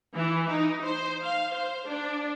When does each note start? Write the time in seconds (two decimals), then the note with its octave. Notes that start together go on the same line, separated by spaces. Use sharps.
0.14 E3
0.50 D#4
0.82 C5
1.22 F5
1.54 C5
1.86 D4